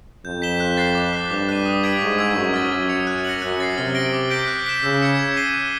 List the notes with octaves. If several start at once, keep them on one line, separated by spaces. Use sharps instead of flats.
F2 G6
B6 E7 G7
F#6
A6 C7
D6
F#6 B6
G2 D6
F#6 B6 D#7
D#6
G#6 B6 D7 F#7
G#2 C#6
E6 G#6
F#2 C#6
F6 A6
F#2 A6
C#7 F7
F#6
A#6 C#7 F#7
F#2 F#6
A6 C7
C3 F6
A#6 D7 G7
D6
G6 B6 D7 G7
F#6
B6 E7
C#3 E6
G#6 C#7 E7
G#6
C7 D#7 G7
F#6